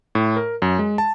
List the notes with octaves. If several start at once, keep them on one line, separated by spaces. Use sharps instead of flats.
A2
A#4
F#2
G#3
A5